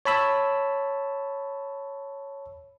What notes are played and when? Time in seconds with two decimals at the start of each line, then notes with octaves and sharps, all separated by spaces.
0.05 C#5 A5 B5 E6